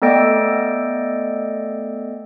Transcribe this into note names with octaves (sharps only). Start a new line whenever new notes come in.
A3 B3 A4 D5 D#5 G5